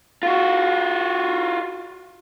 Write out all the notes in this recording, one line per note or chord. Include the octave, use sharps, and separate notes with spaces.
F4 F#4